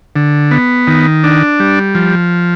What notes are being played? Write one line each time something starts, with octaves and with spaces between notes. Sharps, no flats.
D3
B3
D#3
D4
G3
F3